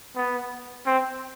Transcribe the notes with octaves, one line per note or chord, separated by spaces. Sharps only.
B3
C4